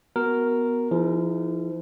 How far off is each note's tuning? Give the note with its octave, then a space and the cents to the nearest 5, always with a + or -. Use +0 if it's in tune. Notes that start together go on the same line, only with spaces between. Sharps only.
B3 +0 F#4 +0 A#4 +0
F3 -40 D#4 +40 G#4 +15